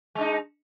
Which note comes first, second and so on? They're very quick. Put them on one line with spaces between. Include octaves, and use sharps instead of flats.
G#3 D4 D#4